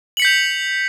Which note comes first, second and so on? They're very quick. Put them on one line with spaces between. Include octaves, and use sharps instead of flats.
F#7 C#7 B6 G6 F7